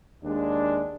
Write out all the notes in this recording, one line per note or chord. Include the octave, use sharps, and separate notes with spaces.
D#2 G#3 D4